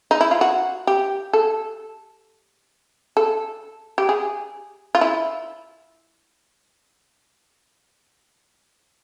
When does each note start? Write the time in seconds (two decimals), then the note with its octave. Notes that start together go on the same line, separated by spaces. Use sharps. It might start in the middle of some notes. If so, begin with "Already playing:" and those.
0.11 D#4
0.21 E4
0.31 F4
0.41 F#4
0.87 G4
1.33 A4
3.17 A4
3.98 G4
4.09 G#4
4.95 F4
5.01 E4